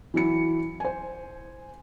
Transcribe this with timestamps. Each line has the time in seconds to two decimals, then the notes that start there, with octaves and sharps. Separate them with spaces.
0.14 E3 F#3 E4 C#7
0.80 C5 G#5